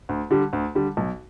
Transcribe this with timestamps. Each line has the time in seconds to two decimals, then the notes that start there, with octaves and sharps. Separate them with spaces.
0.09 D2
0.31 D3 G3
0.53 D2
0.75 D3 G3
0.97 B1